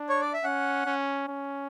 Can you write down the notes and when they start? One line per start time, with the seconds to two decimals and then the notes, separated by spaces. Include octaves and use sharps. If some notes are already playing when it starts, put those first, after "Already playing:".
Already playing: D4
0.09 C#5
0.21 D5
0.33 E5
0.44 C#4 F#5
0.86 C#4
1.28 C#4